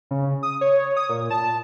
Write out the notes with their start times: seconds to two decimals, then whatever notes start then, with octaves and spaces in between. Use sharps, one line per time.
0.11 C#3
0.43 D#6
0.61 C#5
0.97 D#6
1.09 A#2
1.30 A5